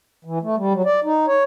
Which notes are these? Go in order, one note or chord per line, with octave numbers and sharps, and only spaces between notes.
E3
A3
G3
F#3
D5
D#4
C#5